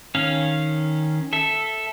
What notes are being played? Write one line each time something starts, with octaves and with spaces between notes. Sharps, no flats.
D#3 C#4 F5
A4 E5